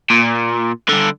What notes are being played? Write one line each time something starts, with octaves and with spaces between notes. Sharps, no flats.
A#2
G2 D3